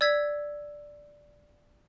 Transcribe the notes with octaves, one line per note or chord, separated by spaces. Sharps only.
D5 E6 G#6 B6